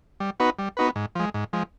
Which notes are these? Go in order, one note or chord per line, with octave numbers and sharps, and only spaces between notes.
G3
B3 D#4 F#4 B4
G3
B3 D#4 F#4 B4
G#2
F3 G#3
G#2
F3 G#3